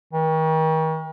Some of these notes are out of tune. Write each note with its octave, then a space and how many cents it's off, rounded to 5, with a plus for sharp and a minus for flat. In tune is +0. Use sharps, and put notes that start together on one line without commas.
D#3 +40